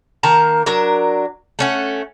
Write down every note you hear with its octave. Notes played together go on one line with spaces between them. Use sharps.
D#3 A#3 A5 A#5
F#3 D4 A#4
A3 C#4 F#5